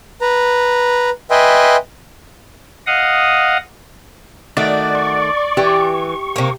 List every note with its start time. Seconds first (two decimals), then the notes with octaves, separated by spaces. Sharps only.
0.21 B4 A#5
1.31 B4 D#5 E5 G5 G#5 C6
2.87 D#5 F5 F#5 D#6
4.57 D#3 A3 F#4 D5
4.95 C#6
5.57 E3 G4
6.36 C3 A#3